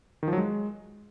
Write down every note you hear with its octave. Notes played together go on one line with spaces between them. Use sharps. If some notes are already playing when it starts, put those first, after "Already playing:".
D#3
F3
F#3
G#3